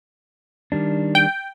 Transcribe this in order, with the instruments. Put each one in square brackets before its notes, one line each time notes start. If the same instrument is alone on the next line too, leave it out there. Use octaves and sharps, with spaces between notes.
[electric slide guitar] D#3 G3 D4
[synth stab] G5